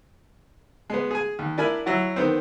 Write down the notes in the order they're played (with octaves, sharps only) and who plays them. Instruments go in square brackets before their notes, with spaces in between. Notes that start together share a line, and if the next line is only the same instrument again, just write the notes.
[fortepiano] G#3 B3
G#4 G#5
D#2
D4 E4 A#4 G#5 B5
F#3 E4 F#4
D#3 B3 C4